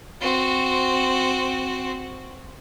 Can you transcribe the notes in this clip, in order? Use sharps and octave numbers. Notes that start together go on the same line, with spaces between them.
C4 F#4